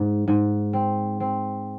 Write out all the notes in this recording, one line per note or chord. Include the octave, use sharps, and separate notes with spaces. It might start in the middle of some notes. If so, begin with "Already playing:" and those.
Already playing: G#2
G#2
C4
C4